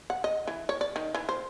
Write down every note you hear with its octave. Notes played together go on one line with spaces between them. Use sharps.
F#5
D#5
E3
C#5
D5
D#3
E3
C5